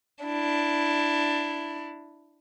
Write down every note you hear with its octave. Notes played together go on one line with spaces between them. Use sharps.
D4 E4